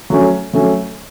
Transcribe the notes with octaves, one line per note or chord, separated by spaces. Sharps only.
F#3 A3 C#4
F#3 A3 C#4